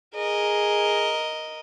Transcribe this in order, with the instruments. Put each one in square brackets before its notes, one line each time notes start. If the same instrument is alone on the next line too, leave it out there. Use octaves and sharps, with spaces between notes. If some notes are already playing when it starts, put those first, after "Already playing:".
[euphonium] G#4 [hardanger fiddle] A#4 D#5